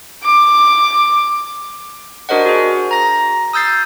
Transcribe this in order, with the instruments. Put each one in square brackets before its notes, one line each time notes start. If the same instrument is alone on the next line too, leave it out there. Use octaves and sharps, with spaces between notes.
[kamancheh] D6
[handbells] D4 F#4 A#4 C5 D#5 F#5
F#4 G#4
A#5 A#6
D#6 E6 G6 A6 C7